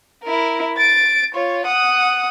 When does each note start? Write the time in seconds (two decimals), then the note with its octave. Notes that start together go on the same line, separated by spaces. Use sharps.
0.23 E4 A#4
0.77 A6 D7
1.35 F4 C#5
1.66 F#5 D#6